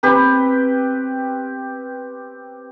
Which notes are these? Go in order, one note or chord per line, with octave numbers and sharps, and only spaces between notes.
C4 G4 B4